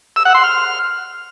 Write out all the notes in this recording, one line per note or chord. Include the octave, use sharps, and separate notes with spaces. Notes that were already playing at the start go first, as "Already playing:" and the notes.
E6
F#5
C6
F6